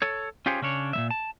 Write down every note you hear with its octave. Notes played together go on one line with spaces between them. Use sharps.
A4 C#5
C#4 F4 G4 G#4 C5 C#5
C#3 C#4 D4 C#5
A#2 G3 E5
A5